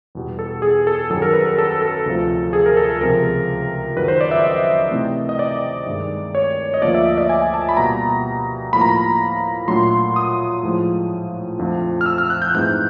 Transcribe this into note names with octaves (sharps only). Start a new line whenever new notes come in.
E2 B2 G3
A4
G#4
A4
F#2 D#3 F#3 A4
A#4
B4
A#4
A4
A4
D2 C3 F3 A3
G#4
A#4
A4
C#2 C3 F3 A#4
F#2 D#3 F#3 B4
C5
D5
E5
D#5
C3 E3 A3 C4
D#5
D5
G2 D#3 G#3
C#5
D#5
D2 D3 F3 A#3 D4 D5
E5
D#5
D5
G#5
A5
B5
B2 G3 A#3 A#5
A2 F3 A#3 B5
A#5
B5
A#2 F#3 A3 D4 C6
D#6
A2 F3 G#3
F2 D3 F3 A3
F6
E6
F6
F#6
G6
G#2 E3 A3 C4 D#4 G6